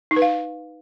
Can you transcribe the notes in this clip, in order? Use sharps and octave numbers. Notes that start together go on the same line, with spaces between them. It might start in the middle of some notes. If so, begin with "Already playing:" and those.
D#4
B4
F5